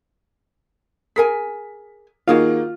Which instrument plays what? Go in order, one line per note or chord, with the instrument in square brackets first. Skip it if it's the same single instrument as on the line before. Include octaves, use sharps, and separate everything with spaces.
[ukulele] G#4 A#4 G#5 [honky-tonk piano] B6
[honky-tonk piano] D#3 A#3 [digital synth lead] F4 [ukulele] F#4 G#4 F5